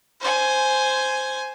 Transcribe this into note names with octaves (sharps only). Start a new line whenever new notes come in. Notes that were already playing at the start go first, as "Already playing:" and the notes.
C5 G#5